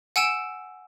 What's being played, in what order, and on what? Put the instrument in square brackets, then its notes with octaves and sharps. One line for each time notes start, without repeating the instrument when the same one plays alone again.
[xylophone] F#5 G#5 E6 D7 E7